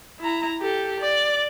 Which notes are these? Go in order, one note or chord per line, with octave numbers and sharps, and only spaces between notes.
E4 A#5
G4 A4
D5